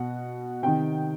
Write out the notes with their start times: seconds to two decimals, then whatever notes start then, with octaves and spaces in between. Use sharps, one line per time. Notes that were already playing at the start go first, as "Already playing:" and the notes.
Already playing: B2 F#5
0.63 C3 D#3 G5